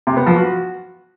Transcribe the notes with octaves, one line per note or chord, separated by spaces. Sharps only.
C3
B3
F3
F#4